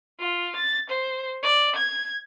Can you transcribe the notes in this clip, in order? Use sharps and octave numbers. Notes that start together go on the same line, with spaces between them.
F4
A6
C5
D5
G#6